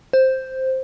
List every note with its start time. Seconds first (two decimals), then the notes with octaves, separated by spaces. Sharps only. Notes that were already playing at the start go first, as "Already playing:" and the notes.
0.13 C5